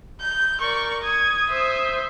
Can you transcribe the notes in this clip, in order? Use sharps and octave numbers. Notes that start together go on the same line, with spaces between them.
G6
A#4 D5 C#6
D#6 G#6
C5 E5